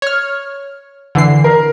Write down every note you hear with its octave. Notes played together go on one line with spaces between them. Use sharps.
C#5 F6
D3 E3 C7
A#4